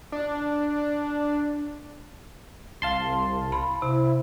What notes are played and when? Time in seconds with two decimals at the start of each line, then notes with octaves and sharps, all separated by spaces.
0.12 D4
2.82 C2 F5 A5 C6
3.52 B5
3.82 C3 E4